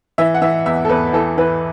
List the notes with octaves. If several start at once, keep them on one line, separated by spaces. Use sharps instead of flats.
E3 E5
F#5
E3 E5
E2 E5
A4
E2 B4
E3 A4
E3 B4